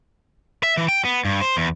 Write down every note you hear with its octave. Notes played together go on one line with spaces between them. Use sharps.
E5
E3
G5
B3
G2
C5
E2